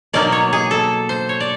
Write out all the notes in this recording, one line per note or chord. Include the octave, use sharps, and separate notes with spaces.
B2 F#3 A#3 D#4 D5
C#5
G#4
A4
C5
C#5
D5